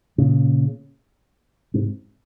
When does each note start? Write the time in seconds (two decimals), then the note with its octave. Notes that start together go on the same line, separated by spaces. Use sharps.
0.18 A#2 C#3
1.74 G#2 C3